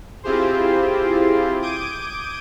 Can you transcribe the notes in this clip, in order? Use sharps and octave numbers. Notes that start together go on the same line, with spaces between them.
C4 E4 F4 G4 G#4 C5
D6 D#6 G6 G#6 D7 D#7